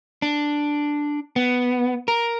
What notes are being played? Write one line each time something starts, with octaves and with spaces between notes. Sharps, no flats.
D4
B3
A#4